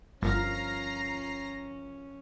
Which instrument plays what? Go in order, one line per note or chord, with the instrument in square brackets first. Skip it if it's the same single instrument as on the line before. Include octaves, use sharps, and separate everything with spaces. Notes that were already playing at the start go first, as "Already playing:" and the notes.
[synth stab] G1 [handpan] F3 A#4 F5 [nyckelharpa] C#4 [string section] A#5 A#6 C7